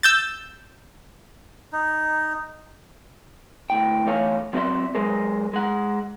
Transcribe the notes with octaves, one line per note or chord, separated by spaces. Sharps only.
E6 G6 A6
D#4
D2 A2 G5
D2 E3 A3 C#5 F5 G#5
F#3 C4 F#4 D5 E5 C6
F#3 G#3 G#4 A#4 C5
G#3 F#5